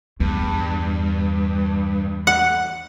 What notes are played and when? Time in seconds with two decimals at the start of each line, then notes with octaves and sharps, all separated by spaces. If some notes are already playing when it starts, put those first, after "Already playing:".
0.20 E2 G2
2.27 F#5